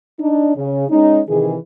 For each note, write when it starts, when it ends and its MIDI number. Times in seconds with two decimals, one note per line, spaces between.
0.19 0.55 62
0.19 0.55 63
0.56 0.88 49
0.90 1.20 56
0.90 1.20 61
0.90 1.20 63
1.29 1.55 48
1.29 1.55 51
1.29 1.55 52
1.29 1.55 68